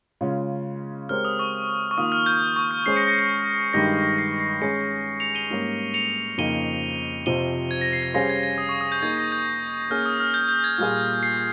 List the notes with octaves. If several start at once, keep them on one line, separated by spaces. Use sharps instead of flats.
C#3 G#3 C#4 F4
G#3 C4 G4 A#4 C#5 F6
D#6
C#6
C#6
D#3 A#3 F4 D#6
F6
G6
C#6
F6
G#3 C#4 G#4 C5 C7
A#6 C#7
A#6 C#7
A#6
G2 D#3 G#3 D#4 G4 A#6
C7
C7
G#3 C#4 G#4 A#6 C#7
C#7 F7
D#7 G7
G#2 G3 A#3 C#4
C#7 F7
F2 C#3 F3 A#3 D#4 D#7 G7
F2 C3 F3 D#7 G7
G#6
A#6
C7
A#6
G3 C#4 G#4 C5 F5 A#6
G#6
G#6
D#6
C#6
D#6
G6
A#3 D#4 G#4 G#6
A#6
G6
A#3 C#4 G#4 F6
D#6
F6
G6
G6
G#6
A#2 G3 A#3 F4 G#4
C7